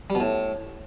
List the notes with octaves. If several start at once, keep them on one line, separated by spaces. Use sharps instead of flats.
G3
B2
A2